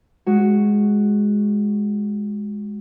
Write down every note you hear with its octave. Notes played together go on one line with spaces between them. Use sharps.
G#3 F#4